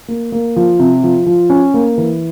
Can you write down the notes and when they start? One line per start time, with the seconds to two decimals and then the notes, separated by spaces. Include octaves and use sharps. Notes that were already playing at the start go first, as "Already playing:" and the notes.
0.08 A#3
0.32 A#3
0.56 F3
0.79 C3
1.03 F3
1.26 F3
1.50 C#4
1.74 A#3
1.98 E3